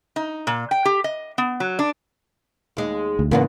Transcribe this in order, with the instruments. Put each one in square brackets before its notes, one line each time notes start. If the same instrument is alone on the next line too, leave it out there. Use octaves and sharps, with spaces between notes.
[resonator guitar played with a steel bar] D#4
A#2
G5
G4
D#5
B3
F#3
D4
[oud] D#2 G#3
[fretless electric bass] D2
[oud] E2 G#2 B3 [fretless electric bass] C#3 E3 A#3